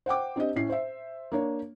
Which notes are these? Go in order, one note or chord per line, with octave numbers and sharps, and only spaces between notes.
C5 F#5 G5 D6
C4 D4 G4 D#5
A2 C#4 C7
C5 E5
A#3 D4 C#5